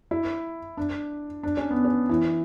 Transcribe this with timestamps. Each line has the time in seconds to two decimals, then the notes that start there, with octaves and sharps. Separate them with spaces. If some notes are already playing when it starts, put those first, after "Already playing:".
0.11 E4
0.77 D4
1.43 D4
1.57 C#4
1.71 B3
1.85 C#4
2.09 E3